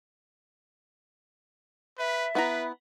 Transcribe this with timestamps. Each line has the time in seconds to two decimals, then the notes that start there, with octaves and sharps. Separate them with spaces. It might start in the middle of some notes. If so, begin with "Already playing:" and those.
1.99 B4 E5
2.35 B3 E4 B4 A#5